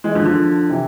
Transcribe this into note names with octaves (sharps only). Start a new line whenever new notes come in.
E3 G#3
D3 F3
D3 F3
C3 E3